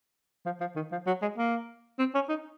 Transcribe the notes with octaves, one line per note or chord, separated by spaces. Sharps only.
F3
F3
D#3
F3
F#3
G#3
A#3
C4
C#4
D#4